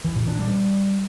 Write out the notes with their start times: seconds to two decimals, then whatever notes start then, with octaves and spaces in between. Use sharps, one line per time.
0.05 E3
0.16 A#2
0.28 D4
0.39 G3